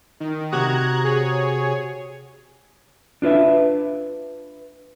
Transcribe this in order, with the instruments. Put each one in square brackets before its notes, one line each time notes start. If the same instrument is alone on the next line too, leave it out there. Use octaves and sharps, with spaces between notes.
[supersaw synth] D#3
[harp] C3 F#4 D#6 [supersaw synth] A#5 F#6 G#6
[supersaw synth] G#4 C#5
[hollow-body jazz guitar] D4 F4 B4 E5